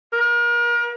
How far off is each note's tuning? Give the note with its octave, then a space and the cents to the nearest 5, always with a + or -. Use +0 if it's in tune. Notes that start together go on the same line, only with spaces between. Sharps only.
A#4 +35